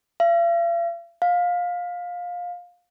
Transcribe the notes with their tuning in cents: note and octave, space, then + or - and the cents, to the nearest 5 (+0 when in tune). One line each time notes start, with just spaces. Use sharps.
F5 -45
F5 +20